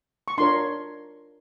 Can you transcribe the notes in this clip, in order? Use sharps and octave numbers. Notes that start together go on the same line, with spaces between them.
C#6
D4 F4 A#4 C#5 C6